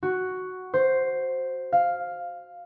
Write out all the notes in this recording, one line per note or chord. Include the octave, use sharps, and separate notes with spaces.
F#4
C5
F5